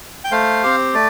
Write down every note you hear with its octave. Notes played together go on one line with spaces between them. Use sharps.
G5
A3 C5 F5
C4 G4
A3 D5